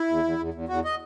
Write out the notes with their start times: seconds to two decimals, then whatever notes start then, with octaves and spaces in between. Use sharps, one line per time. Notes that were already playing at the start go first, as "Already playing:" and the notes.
Already playing: E4
0.09 E2
0.24 E2
0.38 E2
0.54 E2
0.68 E2 F#4
0.85 D#5